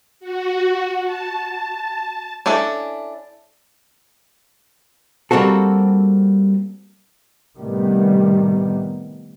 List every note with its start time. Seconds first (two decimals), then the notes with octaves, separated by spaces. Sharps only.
0.20 F#4
1.03 A5
1.38 A5
2.46 C#4 D4 E4 A4
5.31 G3 A#3 C4 F#4 A4
7.56 A2 C3 D#3 G3 B3